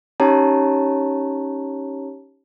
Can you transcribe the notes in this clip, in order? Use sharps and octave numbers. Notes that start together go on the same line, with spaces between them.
C#4 D#4 G4 C#5 A5 A#5